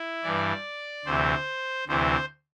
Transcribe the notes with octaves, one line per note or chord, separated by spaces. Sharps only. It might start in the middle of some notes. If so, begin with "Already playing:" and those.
Already playing: E4
G2 E3 D5
D2 C3 E3 C5
D2 C3 E3 C5